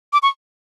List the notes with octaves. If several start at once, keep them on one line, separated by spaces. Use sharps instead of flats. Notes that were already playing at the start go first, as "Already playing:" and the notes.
D6
C#6